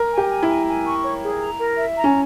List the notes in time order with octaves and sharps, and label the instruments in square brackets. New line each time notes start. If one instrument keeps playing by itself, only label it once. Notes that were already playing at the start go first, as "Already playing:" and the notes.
Already playing: [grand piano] A#4
[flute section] G#5
[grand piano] G4
[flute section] G#5
[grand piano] E4
[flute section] G#5
G#5
C#6
C#5
G#4
A#5
A#4
E5
A#5
[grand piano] C#4